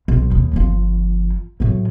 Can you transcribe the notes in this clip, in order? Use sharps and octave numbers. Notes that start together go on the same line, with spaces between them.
B1
D#2
G1 F3
A2 F#3